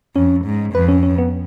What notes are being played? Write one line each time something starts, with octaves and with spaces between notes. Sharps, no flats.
F2 C#4
G#2
F2 B4
C#4
C#4
B3